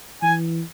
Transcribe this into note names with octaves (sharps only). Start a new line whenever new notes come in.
E3 G#5